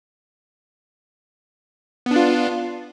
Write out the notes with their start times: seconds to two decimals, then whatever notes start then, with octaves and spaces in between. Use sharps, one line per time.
2.06 B3
2.11 D4
2.16 F4